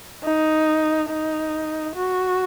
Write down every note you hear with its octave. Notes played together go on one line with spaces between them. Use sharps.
D#4
D#4
F#4